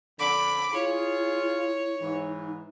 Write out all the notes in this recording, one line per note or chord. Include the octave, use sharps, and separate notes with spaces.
F2 D3 B5 D6
E4 F4 G#4 C#5
G#2 E3 D#4